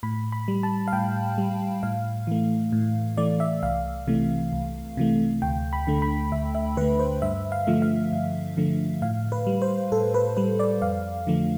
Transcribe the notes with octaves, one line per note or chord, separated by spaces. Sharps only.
A2 B5
B5
G3
A5
F5
A2 G5
G3
A2 F5
E3 A3
A2
E3 A3 D5
E5
C2 F5
C3 E3 A3
C2
C3 E3 A3
D2 G5
B5
D3 A3
B5
D2 E5
E5
D3 A3 B4
C5
G2 E5
F5
D3 F3 A3
F5
G2
D3 F3 A3
A2 F5
B4
G3
C5
A2 A4
B4
G3 B4
D5
F2 F5
D3 F3 A3